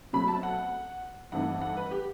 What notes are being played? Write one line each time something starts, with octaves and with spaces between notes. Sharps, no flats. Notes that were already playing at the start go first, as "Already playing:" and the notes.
B2 F#3 A3 C4 B5
A5
F#5
G2 E3 A3 C4 D#4 F#5
F#5
B4
G4